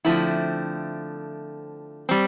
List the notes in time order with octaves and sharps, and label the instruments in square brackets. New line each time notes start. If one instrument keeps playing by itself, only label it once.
[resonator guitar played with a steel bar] D3 F3 A3 C4 E4
G3 C4